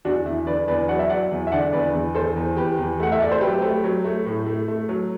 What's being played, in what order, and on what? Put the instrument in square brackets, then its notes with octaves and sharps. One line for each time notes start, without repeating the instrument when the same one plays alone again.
[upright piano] E2 D4 F#4
E2 E4
D3 B4 D5
E2 B4 D5
F#3 D5 F#5
E5
F#3 D5 F#5
E2
E5
D3 D5 F#5
E2 B4 D5
E2
E2 A4 C5
E2
E2 G4 B4
E2
A3 F#5
E5
A3 D5
C5
F#3 G4 B4
A3
F#3
A3
A2
A3
A3
F#3